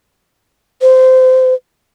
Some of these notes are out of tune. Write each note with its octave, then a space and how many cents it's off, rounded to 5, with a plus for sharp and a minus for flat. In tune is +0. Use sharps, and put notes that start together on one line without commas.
C5 -20